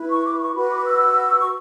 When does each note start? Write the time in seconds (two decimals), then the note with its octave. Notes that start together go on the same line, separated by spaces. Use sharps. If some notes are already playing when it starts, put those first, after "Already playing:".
Already playing: E4 B4
0.09 C#6
0.25 D6
0.39 C#6
0.55 F#4 B4 B5
0.70 D6
0.85 E6
1.38 C#6